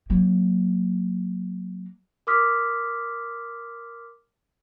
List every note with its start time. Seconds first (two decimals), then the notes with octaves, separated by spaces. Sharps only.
0.10 F#3 A#3
2.27 A#4 C6 D6 D#6 F6 B6